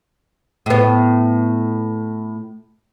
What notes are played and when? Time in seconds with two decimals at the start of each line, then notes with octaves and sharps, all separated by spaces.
0.66 A2 B3